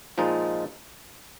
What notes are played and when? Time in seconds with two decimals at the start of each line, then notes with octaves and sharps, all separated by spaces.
0.18 A#2 F3 G#3 D#4